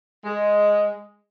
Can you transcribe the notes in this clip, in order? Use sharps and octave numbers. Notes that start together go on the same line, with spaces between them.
G#3